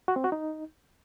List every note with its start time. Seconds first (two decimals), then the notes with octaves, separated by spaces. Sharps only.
0.08 F#4
0.16 C4
0.24 F#4
0.32 D#4